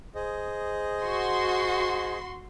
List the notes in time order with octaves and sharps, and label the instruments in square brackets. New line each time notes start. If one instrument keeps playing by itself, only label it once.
[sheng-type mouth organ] G#4 C5 D#5
[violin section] F#4 C6